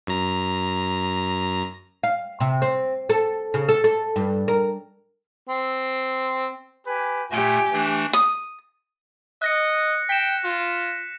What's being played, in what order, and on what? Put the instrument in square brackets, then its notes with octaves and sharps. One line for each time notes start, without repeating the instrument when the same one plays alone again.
[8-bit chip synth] F#2 A#5
[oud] F5
C3
C4
A4
C#3
A4
A4
G2
A#4
[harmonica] C4
[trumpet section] G4 B4 G#5
[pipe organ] A#2 A3 [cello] G4 [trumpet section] G#5
[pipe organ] E3 A3 D4
[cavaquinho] D#6
[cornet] D#5 [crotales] F#6 A#6 C#7
[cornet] G5 [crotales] B6 E7
[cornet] F4